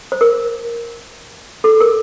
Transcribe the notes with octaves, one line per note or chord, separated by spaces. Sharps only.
C5
A#4
A4
A#4